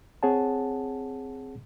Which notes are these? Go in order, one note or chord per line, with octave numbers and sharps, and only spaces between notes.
C4 G#4 C#5 F#5 A5